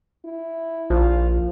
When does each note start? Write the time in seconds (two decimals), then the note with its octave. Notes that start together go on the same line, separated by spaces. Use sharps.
0.25 E4
0.90 A#1 F3 F4